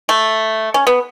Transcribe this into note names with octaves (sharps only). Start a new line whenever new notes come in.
A3
C#4
B3